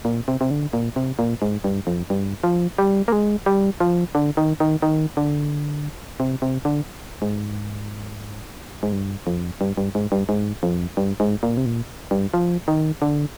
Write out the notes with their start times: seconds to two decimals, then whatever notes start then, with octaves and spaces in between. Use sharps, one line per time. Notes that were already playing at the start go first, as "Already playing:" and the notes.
0.05 A#2
0.28 C3
0.41 C3
0.51 D3
0.73 A#2
0.96 C3
1.19 A#2
1.42 G#2
1.64 G2
1.87 F2
2.10 G2
2.44 F3
2.78 G3
3.08 A#3
3.12 G#3
3.46 G3
3.80 F3
4.15 D3
4.37 D#3
4.60 D#3
4.82 D#3
5.17 D3
6.20 C3
6.42 C3
6.65 D3
7.22 G#2
8.83 G#2
8.93 G2
9.27 F2
9.61 G2
9.77 G2
9.95 G#2
10.12 G2
10.29 G#2
10.63 F2
10.97 G2
11.20 G#2
11.43 A#2
11.57 C3
11.66 A#2
12.11 G2
12.34 F3
12.68 D#3
13.02 D3